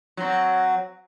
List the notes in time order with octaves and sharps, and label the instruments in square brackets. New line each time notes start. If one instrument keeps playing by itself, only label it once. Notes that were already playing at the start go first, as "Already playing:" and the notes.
[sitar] F#3 C4